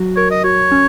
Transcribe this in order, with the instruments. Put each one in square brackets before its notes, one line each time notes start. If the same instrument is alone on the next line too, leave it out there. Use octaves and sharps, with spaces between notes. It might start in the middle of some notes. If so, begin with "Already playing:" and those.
Already playing: [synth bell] F#3 F#4
[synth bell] A#4 [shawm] C#5
[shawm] D#5
[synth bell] F#4 [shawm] C#5
[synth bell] C#4